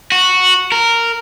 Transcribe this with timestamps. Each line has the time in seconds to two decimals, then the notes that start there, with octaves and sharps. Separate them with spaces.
0.12 F#4
0.72 A#4